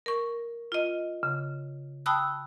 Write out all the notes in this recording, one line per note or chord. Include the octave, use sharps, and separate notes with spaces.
A#4 C#6
F4 D#5
C#3
G5 A5 B5 D#6 E6 F#6